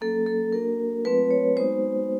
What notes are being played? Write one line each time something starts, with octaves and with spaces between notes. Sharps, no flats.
F#3 A#3 C#4 A4
A4
A#3 D4 F#4 A#4
F#3 A3 C4 F4 B4
C#5
G#3 B3 D#4 F#4 C5